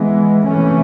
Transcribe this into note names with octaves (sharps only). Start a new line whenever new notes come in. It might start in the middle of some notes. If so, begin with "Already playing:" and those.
Already playing: E3 G#3 B3
C3 E3 A3 C#4